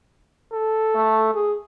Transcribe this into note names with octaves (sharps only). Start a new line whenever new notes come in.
A4
A3
G#4